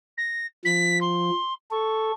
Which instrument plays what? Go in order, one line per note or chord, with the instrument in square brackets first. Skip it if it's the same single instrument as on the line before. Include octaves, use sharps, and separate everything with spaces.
[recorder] A#6
[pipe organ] F3 [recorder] B6
[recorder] C6
[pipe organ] A4 [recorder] C#6